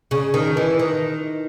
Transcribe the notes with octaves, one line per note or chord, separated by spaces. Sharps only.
C#3
D#3
E3
D#3